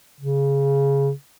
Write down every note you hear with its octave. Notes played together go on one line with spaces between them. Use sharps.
C#3